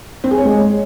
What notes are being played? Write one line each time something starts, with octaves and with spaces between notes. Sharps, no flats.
C4
G#4
C#5
G#3